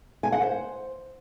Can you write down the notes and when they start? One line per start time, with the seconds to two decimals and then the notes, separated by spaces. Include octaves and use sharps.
0.23 G#5
0.32 F#5
0.41 C5